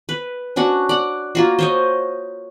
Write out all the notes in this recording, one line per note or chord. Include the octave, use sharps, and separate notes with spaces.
B4
C#4 D4 F#4 F#5
D5 F#5
A#3 F4 F#4
C5 C#5 D#5